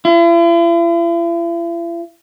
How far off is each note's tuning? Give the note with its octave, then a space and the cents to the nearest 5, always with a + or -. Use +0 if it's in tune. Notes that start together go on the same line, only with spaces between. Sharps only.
E4 +45